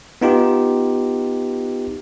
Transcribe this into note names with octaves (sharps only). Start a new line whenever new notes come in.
B3 D#4 F4 G4